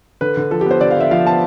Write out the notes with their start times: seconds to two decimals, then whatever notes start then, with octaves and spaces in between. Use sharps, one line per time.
0.21 D3 B4
0.37 D3
0.51 F3 A4
0.61 G4
0.66 B3 C5
0.81 D3 D5
0.91 F5
0.96 D3 E5
1.11 F3 F5
1.25 B3 A5